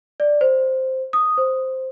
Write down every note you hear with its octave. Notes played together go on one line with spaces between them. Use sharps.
D5
C5
D#6
C5